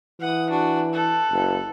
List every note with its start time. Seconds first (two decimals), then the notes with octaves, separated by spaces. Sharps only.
0.20 E3 F#5 D#6
0.50 D4 F#4
0.93 A4 F#6
1.31 F#1